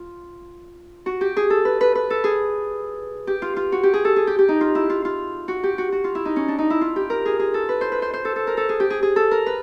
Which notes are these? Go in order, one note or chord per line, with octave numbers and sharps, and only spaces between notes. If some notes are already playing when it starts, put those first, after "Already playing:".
Already playing: F4
F#4
G4
G#4
A4
B4
B4
B4
A4
G#4
G4
F4
F4
F#4
G4
G#4
A4
G#4
G4
G4
D#4
F4
E4
F4
F4
F#4
G4
F#4
F#4
F4
E4
D#4
C#4
D4
D#4
E4
F4
G4
A#4
G#4
G#4
A4
B4
C5
B4
C5
C5
A4
A4
A#4
A4
G#4
G4
G#4
G#4
A4
A#4
B4